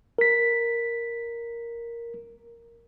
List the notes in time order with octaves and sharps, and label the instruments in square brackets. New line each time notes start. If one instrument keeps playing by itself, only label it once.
[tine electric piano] A#4 B6